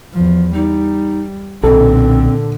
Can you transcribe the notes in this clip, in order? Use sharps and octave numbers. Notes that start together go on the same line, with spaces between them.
E2 F3
G3 D#4
B1 A#2 D3 C4 A4